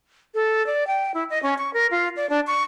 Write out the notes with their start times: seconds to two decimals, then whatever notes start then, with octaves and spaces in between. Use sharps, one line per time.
0.35 A4
0.67 D5
0.87 G5
1.14 E4
1.30 D#5
1.43 C#4
1.58 C#6
1.74 A#4
1.91 F4
2.16 D5
2.30 D4
2.47 C#6